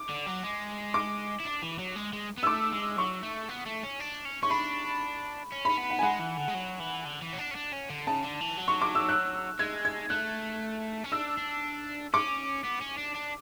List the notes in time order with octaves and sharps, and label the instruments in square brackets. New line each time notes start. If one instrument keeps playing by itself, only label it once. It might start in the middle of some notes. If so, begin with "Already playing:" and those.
Already playing: [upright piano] D6
[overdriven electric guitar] D3
F#3
G#3
[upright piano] D6
[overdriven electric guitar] E4
D4
E3
F#3
G#3
G#3
B3
[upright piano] E6
[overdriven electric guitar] A3 [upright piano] D6
[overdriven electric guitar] G#3
[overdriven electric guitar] F#3 [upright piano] C#6
[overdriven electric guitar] A3
B3
A3
C#4
D4
C#4
[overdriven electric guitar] C#4 [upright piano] C#6
[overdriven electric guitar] D4 [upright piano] B5
[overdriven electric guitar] C#4
[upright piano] B5
[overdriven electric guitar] C#4
B3
[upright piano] F#5
G#5
[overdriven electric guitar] G#3 [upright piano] F#5
[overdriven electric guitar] E3
D3
G#3
F#3
E3
D3
E3
C#4
D4
C#4
D4
C#4
D3
[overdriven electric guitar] C#3 [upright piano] A5
[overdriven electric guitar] D3
E3
F#3
[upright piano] C#6
D6
E6
F#6
[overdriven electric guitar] G#3 [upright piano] G#6
[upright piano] G#6
[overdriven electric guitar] A3 [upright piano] F#6
[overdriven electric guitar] C#4
[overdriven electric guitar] D4 [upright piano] E6
[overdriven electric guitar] D4
[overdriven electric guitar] C#4 [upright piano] D6
[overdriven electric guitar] B3
C#4
D4
D4